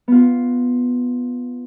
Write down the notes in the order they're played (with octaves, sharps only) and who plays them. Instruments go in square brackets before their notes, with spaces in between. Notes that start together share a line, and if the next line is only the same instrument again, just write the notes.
[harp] B3 F4